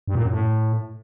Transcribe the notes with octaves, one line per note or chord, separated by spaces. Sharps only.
G2
A#2
F#2
A2